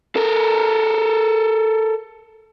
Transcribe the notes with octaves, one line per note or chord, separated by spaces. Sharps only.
A4 A#4